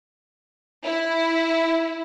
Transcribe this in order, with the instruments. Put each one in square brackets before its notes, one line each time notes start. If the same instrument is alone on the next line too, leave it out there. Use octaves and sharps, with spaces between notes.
[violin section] E4